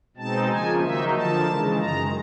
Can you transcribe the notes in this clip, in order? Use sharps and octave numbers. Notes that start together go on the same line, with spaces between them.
B2 G#3 C4 D#4 A5
C#3 F3 A#3 G#5
D#3 F#3 A#3 D#4 E5
D3 F3 A#3 A5
C#3 E3 G#3
F#2 D#3 G#3 A#5